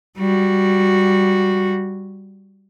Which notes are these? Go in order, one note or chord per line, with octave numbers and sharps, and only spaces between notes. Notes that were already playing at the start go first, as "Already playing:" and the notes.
G3 F#4